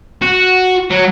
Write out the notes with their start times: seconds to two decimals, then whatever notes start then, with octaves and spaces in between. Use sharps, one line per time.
0.22 F#4
0.90 F#3